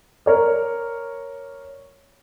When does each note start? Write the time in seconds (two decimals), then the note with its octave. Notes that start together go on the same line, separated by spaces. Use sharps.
0.26 A#4 C#5 D5